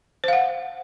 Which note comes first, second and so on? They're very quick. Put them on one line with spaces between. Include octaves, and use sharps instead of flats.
C5 F5 F#5